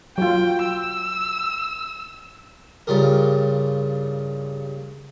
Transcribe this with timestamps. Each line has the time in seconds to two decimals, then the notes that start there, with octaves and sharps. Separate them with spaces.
0.18 F#3 F4 G5
0.64 E6
2.87 G2 C#3 F4 G4 A#4